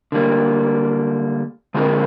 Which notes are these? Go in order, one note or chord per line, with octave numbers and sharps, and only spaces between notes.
D3 G3 A#3
D3 G#3 C4 F4 A#4